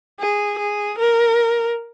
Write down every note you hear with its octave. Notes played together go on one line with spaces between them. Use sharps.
G#4
G#4
A#4